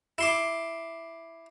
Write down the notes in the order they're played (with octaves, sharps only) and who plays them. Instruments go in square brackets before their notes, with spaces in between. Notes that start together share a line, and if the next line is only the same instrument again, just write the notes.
[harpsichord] E4 C6 D6